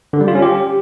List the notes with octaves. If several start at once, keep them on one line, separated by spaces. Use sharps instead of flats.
D3
G3
F4
C#4
G4